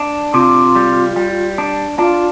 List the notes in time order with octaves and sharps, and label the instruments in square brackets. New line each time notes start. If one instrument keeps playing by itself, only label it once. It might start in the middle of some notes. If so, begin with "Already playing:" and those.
Already playing: [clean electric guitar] D4
[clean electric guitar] C3 [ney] F4
[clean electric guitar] G3
G3
D4
[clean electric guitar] D4 [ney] F4